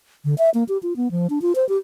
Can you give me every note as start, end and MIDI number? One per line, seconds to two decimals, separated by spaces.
0.25 0.35 50
0.38 0.50 76
0.54 0.64 58
0.69 0.78 67
0.83 0.93 65
0.96 1.11 59
1.11 1.27 53
1.30 1.39 62
1.42 1.53 65
1.55 1.67 72
1.69 1.77 67